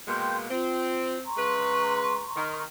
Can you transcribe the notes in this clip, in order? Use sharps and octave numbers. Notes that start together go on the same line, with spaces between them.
B2 G#3 A#3 G5 C6 G6
C4 F4
A#5 C6 C#6
C#3 G#3 B4
D#3